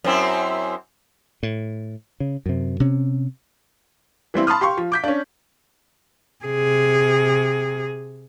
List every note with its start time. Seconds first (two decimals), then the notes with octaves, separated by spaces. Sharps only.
0.04 F#2 C4 E4
1.43 A2
2.20 C#3
2.46 F#2 C3
2.80 C3 C#4
4.34 E3 G3 C4 E4
4.47 A5 B5 C6 D#6 F6
4.61 G4 F5 C6 C#6
4.77 F3
4.92 D6 G6 B6
5.04 C#4 D4
6.45 C3 G#4